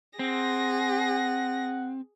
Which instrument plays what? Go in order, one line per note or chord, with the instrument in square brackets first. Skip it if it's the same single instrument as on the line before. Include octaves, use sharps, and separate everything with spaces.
[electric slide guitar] C4 [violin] G#4 A#6 [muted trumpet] F#5